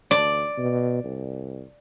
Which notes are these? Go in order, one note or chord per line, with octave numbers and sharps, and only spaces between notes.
D2 D5
B2
C2